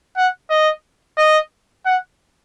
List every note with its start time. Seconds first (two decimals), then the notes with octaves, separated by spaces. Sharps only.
0.17 F#5
0.50 D#5
1.18 D#5
1.86 F#5